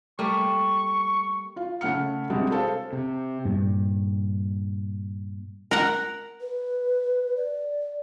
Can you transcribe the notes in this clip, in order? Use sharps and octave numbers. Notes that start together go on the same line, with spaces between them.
G3 A3 A#3 C#6
F4 F5
C#3 A3 F#5 F6 C#7
C3 G3 G#3 D4 F#4 G4
G#4 A4 C5 F5
C3
G2 A#2
A#4 F#5
B4
D5